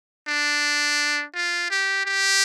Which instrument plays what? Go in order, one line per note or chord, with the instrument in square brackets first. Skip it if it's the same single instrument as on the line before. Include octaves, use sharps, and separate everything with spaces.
[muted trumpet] D4
F4
G4
G4